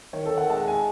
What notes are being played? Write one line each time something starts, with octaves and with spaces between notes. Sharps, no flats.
D#3 C#5
A4
D#3
F#5
G#3 A5
G#5